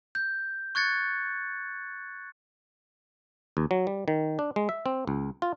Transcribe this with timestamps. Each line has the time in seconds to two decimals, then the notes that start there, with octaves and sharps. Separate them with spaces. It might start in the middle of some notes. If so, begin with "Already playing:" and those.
0.15 G6
0.75 C#6 F#6 G#6 A6 C#7
3.57 D#2
3.71 F#3
3.87 G3
4.08 D#3
4.39 D4
4.56 G#3
4.69 E5
4.86 C4
5.07 C#2
5.42 F4